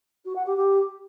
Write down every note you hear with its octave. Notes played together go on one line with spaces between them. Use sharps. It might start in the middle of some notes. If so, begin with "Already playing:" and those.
F#4
F#5
G4
G4